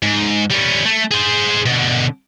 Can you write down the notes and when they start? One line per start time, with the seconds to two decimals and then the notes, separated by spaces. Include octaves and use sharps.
0.03 G#2
0.51 G3 C#4
0.85 A3
1.11 G#4 C5
1.66 B2 D3